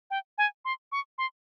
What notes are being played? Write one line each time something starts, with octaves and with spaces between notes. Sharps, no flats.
G5
G#5
C6
C#6
C6